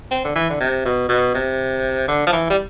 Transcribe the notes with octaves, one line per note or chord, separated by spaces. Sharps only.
C4
D3
E3
D3
C3
B2
B2
C3
D3
F3
E3
G3